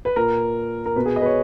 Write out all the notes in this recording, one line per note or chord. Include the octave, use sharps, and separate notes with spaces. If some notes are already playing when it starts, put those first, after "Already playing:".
B4
A#2 A#4
A#4
B2 B4
G#4
D#5
B4
C#5